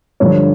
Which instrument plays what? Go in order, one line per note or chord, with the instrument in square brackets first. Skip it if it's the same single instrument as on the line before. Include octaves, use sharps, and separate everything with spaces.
[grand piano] G2 D3 F3 C#5